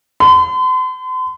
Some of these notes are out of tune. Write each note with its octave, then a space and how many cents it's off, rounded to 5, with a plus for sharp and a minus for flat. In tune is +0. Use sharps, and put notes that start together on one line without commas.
C6 -45